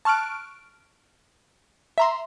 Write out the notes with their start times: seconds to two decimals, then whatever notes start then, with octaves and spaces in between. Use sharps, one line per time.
0.05 A5 C#6 F6 F#6 D7
1.98 E5 A#5 C6